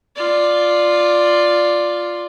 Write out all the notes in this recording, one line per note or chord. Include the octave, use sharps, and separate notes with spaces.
F4 D5